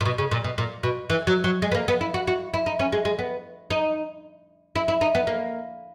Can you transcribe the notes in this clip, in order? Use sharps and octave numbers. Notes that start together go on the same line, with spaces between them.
A#2
B2
C#3
A#2
B2
A#2
B2
E3
F#3
F#3
G#3
B3
A#3
B3
E4
F#4
F#4
E4
D#4
C#4
G#3
G#3
B3
D#4
E4
E4
D#4
B3
A#3